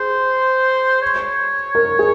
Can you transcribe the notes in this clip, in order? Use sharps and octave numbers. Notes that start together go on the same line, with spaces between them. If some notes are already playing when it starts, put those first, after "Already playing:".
Already playing: G#4 C5
C#5
A#4
G#4